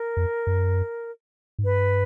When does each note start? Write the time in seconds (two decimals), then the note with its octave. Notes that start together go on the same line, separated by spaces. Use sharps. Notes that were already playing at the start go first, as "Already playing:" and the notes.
Already playing: A#4
0.17 F2
0.47 F#2
1.59 G#2
1.64 G2 B4